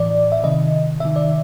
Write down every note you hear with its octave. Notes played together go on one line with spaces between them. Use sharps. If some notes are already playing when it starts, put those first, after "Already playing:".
Already playing: A2 E3 D5
E5
C3 D#3 D#5
C3 D#3 E5
D5